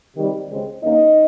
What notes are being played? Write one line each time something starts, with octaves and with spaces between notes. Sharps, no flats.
C3 D#3 G3
C#2 C#3 G#3 C4
G2 D#3 A#3 C#4 D#4 D#5